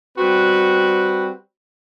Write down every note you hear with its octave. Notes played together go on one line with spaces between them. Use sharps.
G3 C4 F#4 B4